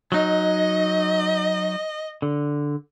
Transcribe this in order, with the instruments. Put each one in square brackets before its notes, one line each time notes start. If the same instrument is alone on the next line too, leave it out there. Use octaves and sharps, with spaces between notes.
[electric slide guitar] F#3 D#4 [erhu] D#5
[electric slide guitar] D3